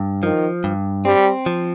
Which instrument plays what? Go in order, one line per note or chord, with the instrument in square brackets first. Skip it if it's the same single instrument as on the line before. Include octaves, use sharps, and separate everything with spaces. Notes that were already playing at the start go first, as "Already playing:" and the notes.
Already playing: [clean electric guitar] G2
[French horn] D#3 [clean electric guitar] F3
[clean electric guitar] G2
[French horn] G3 [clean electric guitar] C4
[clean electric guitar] F3